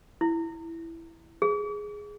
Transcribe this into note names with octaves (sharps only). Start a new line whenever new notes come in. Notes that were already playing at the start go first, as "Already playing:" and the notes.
E4
G#4